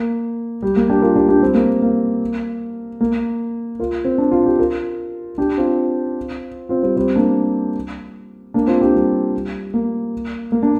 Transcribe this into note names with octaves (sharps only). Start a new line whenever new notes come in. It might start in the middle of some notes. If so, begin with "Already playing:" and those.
Already playing: A#3
G3
A#3
D4 G4
F4 A#4
D4 G4
D4 G4
G3 C4
A#3
A#3
A#3
F4 A#4
C4
D4
F4
G4
F4 A#4
D4 G4
C4 F4
C4 F4
G3 C4
G3 C4
A#3 D4
A#3 D4
C4 F4
D4 G4
G3
A#3
A#3
A#3 D4